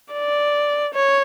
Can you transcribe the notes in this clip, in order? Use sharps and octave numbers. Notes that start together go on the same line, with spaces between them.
D5
C#5